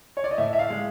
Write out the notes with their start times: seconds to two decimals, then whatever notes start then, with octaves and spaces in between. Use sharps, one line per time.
0.17 C#5
0.24 D5
0.31 D#5
0.38 A2 E5
0.53 E5
0.59 F5
0.70 G#3